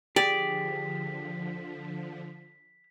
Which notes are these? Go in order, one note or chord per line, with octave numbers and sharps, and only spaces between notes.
D3 F3 G4 G#4 D5 B6